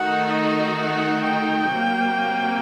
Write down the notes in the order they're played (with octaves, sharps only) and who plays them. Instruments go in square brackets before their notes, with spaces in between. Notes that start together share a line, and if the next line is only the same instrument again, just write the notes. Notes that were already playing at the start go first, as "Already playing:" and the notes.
Already playing: [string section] D#3 A3 D#4 F#4 [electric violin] F#5
[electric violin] D#5
F#5
G5
[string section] C3 F#3 A#3